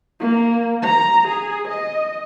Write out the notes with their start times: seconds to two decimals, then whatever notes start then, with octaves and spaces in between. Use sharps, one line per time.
0.20 A#3
0.82 A#5
1.28 G#4
1.68 D#5